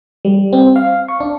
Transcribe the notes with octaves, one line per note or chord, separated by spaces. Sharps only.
G3
C4
F5
C#6
D4